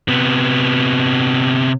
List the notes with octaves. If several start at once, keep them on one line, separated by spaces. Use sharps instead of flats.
C3 B3